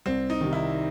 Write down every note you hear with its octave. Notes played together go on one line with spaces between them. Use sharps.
C2 C4
D#4
C3 D#3
E4